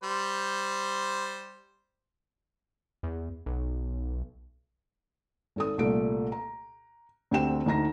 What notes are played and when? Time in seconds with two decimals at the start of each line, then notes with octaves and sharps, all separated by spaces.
0.03 G3 C5
3.03 E2
3.46 B1
5.56 G#1 A4 D#6
5.78 C2 A#2 A3 D7
6.32 A#5
7.31 D2 D3 C4 G4 G5 E7
7.66 D2 D#4 A#5 A#6